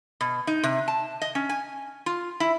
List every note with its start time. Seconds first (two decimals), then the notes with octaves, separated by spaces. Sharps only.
0.21 B2
0.47 D#4
0.63 C3
0.88 A5
1.22 D#5
1.35 C#4
1.49 G#5
2.06 F4
2.40 E4